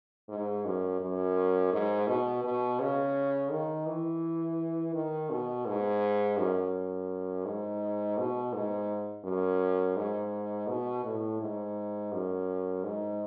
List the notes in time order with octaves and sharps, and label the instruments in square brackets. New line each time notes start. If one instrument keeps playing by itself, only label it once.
[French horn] G#2
F#2
F#2
G#2
B2
B2
C#3
D#3
E3
D#3
B2
G#2
F#2
G#2
B2
G#2
F#2
G#2
B2
A2
G#2
F#2
G#2